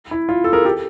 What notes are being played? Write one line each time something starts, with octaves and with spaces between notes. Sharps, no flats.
E4
F4
A4
G#4 A#4
G4 A4